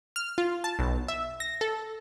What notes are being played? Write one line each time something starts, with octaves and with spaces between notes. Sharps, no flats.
F6
F4
A5
B1
E5
A#6
A4